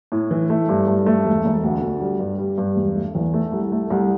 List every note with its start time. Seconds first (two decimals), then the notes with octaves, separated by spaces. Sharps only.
0.12 A2
0.31 E3
0.50 A3
0.69 G2
0.87 G2
1.06 A3
1.25 E1
1.45 E1
1.63 D2
1.83 D2
2.01 G3
2.19 G2
2.38 G3
2.58 G2
2.76 E1
2.96 A3
3.15 E2
3.34 A3
3.52 C2
3.72 A3
3.90 C2